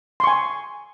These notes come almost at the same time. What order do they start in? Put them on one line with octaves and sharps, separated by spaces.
C6 C#6 G#5